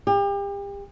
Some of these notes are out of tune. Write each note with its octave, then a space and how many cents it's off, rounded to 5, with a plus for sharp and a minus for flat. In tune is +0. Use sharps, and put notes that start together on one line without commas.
G4 +35